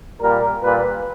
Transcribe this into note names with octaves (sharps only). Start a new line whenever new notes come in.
A#2 G3 A#4
A#2 G3 B4